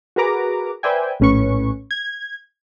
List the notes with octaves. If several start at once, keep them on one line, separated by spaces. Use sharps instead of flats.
F#4 G#4 A#4 B4 A#5 D6
B4 C5 D5 E5 G5 G#5
A#1 A2 C#4 B4 C#6
G#6